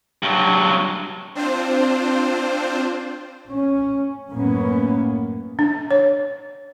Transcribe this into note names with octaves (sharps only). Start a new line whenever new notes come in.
G2 F#3
C4 D4 F4 C5
C#4
F#2 A2 A#3 B3 C#4
D4
C#5